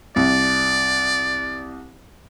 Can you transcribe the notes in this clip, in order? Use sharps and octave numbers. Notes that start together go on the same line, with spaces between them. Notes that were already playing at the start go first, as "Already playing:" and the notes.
C2 D5